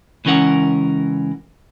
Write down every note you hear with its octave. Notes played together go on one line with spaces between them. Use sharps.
C#2 E3 C#4 A#4 F#5